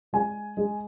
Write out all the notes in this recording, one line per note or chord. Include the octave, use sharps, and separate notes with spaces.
G#3 G#5
G#3